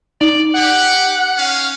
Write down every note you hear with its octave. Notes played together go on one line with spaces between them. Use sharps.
D#4 D5
G4 F#5
C#4 F5